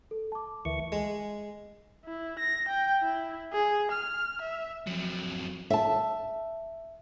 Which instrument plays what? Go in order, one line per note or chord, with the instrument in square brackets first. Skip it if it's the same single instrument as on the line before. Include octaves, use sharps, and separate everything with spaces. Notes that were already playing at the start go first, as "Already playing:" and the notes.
[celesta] A4
A5 D6
[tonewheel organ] D2 E3 C#6 [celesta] A#4 E5
[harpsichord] G#3
[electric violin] E4
A#6
G5
E4
G#4
F6
E5
[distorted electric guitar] F2 F#3
[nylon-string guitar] E5 A5